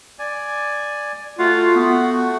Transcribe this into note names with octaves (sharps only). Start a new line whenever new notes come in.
D5 G#5
A3 F4 F#4 F#5
B3